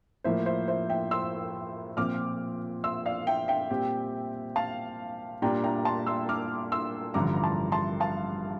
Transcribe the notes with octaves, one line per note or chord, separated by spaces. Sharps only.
A2 F3 A#3 C5 E5
C5 E5
C5 E5
E5 G5
C6 E6
A#2 F3 C4 D6 F6
C6 E6
D5 F5
E5 G5
E5 G5
A#2 G3 C4 G4
F5 A5
A#2 G3 D4 G5 A#5
G5 A#5
A5 C6
C6 E6
D6 F6
C6 E6
A1 G2 D3 F3 A#5 D6
A#5
A5 C6
A5 C6
F5 A5